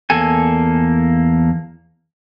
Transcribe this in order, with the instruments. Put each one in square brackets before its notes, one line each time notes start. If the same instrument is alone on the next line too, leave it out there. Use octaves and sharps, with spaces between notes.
[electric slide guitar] E2 A#3 A4 G#5